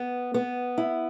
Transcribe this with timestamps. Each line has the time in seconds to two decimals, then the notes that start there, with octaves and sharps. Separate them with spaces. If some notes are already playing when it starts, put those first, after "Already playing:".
Already playing: B3
0.34 B3
0.78 E4